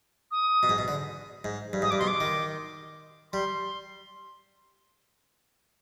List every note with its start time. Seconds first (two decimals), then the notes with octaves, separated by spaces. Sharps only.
0.31 D#6
0.63 B2
0.69 G#2
0.78 B2
0.88 D3
1.45 G#2
1.73 G2
1.82 G#2 D#6
1.91 G2 D6
1.99 B2 C6
2.07 D6
2.20 D#3
3.33 G3 C6